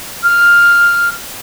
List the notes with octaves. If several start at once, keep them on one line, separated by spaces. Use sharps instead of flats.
F6